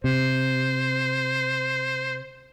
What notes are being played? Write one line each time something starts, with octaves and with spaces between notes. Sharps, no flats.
C3 C5